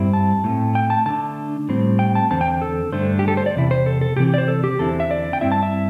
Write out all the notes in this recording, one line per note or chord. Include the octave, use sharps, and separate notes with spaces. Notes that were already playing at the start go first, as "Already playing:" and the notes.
Already playing: G2 G3 C4 E4
A5
A2 A3 C4
G5
A5
D3 A3 D4 A5
A2 G3 C4
G5
A5
E2 D3 C4 A5
G5
A4
G2 D3 A3 D4 C5
G4
A4
C5
D5
E2 C3 E4
C5
A4
A4
C3 E3 C4 G4
G4
D5
C5
A4
G4
E2 D3 C4 E4 A4
E5
D5
G5
G2 D3 C4 E4 E5
A5
E5